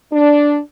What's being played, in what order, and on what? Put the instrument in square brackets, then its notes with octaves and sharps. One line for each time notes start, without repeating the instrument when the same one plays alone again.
[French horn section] D4